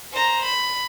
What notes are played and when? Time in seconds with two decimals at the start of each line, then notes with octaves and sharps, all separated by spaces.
0.12 C5 A#5
0.45 B5